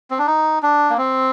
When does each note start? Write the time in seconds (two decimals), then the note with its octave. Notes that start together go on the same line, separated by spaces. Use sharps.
0.11 C4
0.19 D4
0.27 D#4
0.63 D4
0.90 A#3
0.98 C4